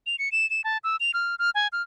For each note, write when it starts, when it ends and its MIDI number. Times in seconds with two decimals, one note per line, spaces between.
0.06 0.16 101
0.19 0.31 97
0.32 0.49 100
0.50 0.61 100
0.64 0.78 81
0.84 0.96 88
1.00 1.11 101
1.14 1.35 89
1.39 1.50 89
1.55 1.68 80
1.72 1.82 89